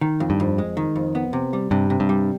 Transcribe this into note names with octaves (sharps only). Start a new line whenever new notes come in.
D#3
F2
G2
F2
G#3
D#3
F2
B3
C3
G3
G2 C3
C3
G2
G3